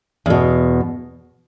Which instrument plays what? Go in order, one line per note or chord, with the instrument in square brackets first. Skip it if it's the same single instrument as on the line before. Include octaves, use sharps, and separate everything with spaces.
[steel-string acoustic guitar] E2 B2